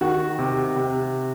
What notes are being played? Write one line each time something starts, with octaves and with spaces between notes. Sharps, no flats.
D#3 F#4
C3
C3